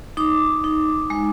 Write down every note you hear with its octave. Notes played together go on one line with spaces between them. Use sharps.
D#4 D6
D#4
G#3